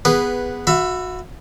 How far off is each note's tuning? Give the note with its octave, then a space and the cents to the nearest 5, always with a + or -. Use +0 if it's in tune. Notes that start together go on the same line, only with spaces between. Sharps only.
B3 +0 G#4 -15 B4 -10
F#4 -25 E5 +15 B5 +15